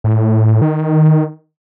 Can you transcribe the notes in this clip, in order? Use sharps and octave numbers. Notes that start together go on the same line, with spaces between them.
A2
D#3